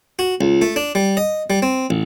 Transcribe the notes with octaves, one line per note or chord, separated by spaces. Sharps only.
F#4
C#2
A3
D4
G3
D#5
G3
C4
A1